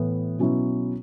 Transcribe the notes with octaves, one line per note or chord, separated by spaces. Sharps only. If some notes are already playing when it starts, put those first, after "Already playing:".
Already playing: A2 E3 B3
B2 F#3 C#4 E4